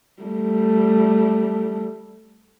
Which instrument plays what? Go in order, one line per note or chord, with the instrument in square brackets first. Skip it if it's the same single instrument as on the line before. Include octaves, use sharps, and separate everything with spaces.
[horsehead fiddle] G3 A3